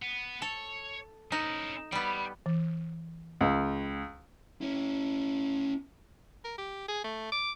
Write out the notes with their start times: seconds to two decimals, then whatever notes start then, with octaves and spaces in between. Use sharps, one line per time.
0.02 B3
0.42 A4 C#5
1.32 C#4 D#4 E4
1.92 G3 B3 G5 B5
2.46 E3
3.41 C#2
4.61 C#4 E4
6.44 A#4
6.58 G4
6.88 G#4
7.04 A3
7.32 D6